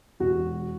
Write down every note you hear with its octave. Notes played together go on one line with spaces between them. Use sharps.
E1 F#4